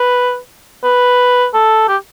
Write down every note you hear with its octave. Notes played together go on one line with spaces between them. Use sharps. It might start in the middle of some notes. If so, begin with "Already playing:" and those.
Already playing: B4
B4
A4
G4